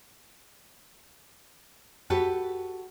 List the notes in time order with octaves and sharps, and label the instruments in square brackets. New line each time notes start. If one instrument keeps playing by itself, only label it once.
[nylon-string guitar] F#4 G4 A4 B4